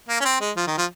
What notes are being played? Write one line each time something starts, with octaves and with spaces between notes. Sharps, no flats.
A#3
C#4
C4
G#3
F3
D#3
F3